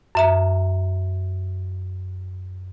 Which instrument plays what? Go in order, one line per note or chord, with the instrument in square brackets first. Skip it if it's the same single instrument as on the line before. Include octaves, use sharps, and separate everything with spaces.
[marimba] F#2 E5 A#5